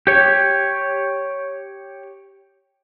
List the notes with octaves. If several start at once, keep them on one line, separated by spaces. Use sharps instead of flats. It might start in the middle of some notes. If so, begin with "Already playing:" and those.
G4 C#5